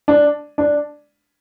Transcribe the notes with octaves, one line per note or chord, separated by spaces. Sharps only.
D4
D4